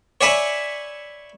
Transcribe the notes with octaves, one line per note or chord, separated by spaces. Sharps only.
C#5 D5 E5 G#5 B5